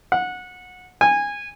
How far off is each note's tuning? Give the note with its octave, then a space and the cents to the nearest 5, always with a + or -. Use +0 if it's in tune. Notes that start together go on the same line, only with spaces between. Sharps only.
F#5 -20
G#5 -20